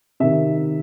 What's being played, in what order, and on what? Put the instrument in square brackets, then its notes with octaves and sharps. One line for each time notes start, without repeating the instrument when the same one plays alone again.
[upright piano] C3 D#3 E5